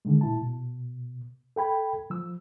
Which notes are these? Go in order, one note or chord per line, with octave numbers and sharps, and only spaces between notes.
D3 D#3 G#3
A#2 E4 A5
B2
A4 G5 B5 G#6
F3 E6